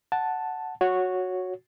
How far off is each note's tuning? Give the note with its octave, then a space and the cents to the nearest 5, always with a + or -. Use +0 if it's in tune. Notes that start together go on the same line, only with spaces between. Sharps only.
F#5 +0 A5 +0
F#4 -10 C#5 +0